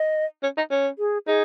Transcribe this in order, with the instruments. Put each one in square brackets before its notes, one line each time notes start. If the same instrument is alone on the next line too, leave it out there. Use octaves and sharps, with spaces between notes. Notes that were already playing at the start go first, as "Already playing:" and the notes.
Already playing: [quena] D#5
[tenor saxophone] C#4
D#4
C#4
[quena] G#4
[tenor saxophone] D#4 [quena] G#4